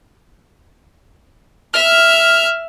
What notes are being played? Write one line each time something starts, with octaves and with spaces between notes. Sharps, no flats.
E5 F6